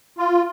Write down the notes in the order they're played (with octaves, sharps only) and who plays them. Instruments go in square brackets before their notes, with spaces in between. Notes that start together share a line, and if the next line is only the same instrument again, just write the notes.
[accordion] F4